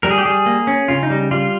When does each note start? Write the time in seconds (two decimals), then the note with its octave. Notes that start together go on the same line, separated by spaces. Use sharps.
0.03 G3 A#4
0.11 G#4
0.18 G4
0.25 G3 G#4
0.46 A#3
0.67 C#4
0.88 C#3 F4
1.03 D#4
1.10 G3
1.31 G3 F4